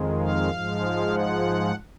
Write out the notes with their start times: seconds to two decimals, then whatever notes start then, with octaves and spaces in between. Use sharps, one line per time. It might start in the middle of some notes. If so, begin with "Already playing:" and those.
Already playing: F2 D#3 G#3
0.19 F5
0.51 G#2 F3 G#3
1.11 F#5